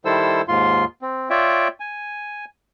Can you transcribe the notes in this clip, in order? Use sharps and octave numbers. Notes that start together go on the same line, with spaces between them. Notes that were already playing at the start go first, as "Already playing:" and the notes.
D#3 G3 E4 A4 C5 E6
D#2 G#2 F4 C6
C4
F4 C#5 D5 E5 G5
G#5